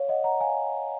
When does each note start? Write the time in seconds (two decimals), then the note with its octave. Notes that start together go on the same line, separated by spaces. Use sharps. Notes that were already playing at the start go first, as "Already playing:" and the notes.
Already playing: C#5 F5
0.09 D#5 F#5
0.24 F#5 A#5
0.40 F5 G#5